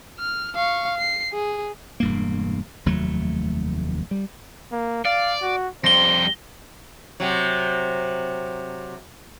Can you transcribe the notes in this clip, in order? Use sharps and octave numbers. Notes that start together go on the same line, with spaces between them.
F6
F5 C#6
C7
G#4
E1 G2 A#3
F1 D#2 F#3 A3
G3
A#3
D5 F5
F#4
F2 G3 C5 A#6 G7
C3 F#3